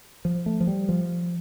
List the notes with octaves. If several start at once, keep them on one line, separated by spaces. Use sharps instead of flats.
F3
A3
F3
G3
F3